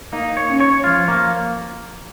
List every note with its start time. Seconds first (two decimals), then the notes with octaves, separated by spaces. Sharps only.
0.12 A#3 D#4
0.37 C#5
0.49 C#4
0.60 C#5
0.84 F3 F4
1.08 A#3